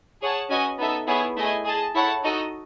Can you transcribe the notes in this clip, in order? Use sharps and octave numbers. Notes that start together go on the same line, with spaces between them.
G#4 C#5 F#5 A5
C#4 F#4 B4 D#5 G#5
B3 D#4 A4 E5
B3 E4 G#4 C#5
A3 E4 G#4 D#5 G#5
G#4 D#5 A5
E4 A4 C#5 F#5 A5
D#4 F#4 A4 D#5